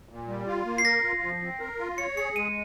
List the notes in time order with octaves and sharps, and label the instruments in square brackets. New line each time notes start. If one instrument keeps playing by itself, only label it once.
[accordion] A#2
G3
F4
A#3
[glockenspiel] C7
[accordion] A#4 [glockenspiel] A#6
[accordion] F4
F3
C4
A#4
F4
[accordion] C#5 [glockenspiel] C#7
[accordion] G#4 [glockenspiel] C#7
[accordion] G#3 [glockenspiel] D#7